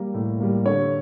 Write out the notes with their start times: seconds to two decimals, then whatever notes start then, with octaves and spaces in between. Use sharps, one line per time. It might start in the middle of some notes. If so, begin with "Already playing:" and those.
Already playing: G3 A#3 A#4
0.14 A2
0.40 G3 A#3
0.66 D3 C#5